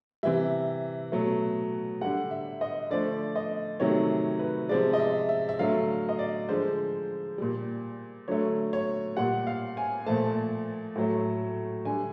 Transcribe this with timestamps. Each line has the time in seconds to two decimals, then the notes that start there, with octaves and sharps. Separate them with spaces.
0.23 C3 E3 G3 E5
1.12 B2 F#3 A3
2.01 D3 G3 F#5
2.31 E5
2.61 D#5
2.90 D3 F3 A3 D5
3.35 D#5
3.80 C3 D#3 F#3 A3 C#5
4.39 B4
4.69 C3 F3 G#3 D5
4.93 D#5
4.99 E5
5.29 E5
5.49 E5
5.59 D3 F#3 A3 F5
6.09 D#5
6.19 D5
6.49 D3 F3 G#3 C5
7.38 A#2 G3
8.28 D3 F#3 A3 C#5
8.73 C#5
9.17 A#2 G3 F#5
9.47 F5
9.77 G#5
10.06 A#2 F3 A3 A5
10.95 A2 F#3 A3
11.85 D3 G3 G#5